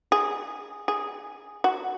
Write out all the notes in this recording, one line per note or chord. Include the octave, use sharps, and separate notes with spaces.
G#4
G#4
F#4